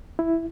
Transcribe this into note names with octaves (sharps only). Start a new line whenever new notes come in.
E4